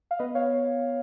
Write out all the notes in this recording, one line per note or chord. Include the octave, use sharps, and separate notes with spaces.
F5
B3 B4 D#5
C#5 F5